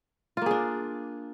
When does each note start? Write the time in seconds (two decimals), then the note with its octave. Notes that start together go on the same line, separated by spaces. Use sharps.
0.37 F4
0.42 A#3
0.46 G#4
0.51 D4